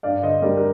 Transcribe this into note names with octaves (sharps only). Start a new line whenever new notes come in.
G2 D5 F5
D3 C5 D#5
G3 A#4 D5
A#4